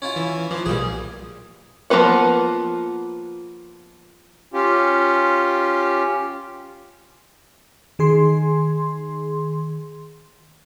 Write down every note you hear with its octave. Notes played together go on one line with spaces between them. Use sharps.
C#4 E4 F4
E3
E3 F3
B1 A#2 G3 G#4
F3 A#3 B3 B4 F#5
C#4 F4 G4
D#3 G#4 C6